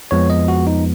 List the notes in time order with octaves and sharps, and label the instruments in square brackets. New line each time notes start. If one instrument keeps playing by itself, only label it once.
[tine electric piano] F2 F3 G#3 B3 C#5
D#5
F#4
D#4